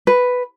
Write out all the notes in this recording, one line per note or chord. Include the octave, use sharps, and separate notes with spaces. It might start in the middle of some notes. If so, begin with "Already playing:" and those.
B4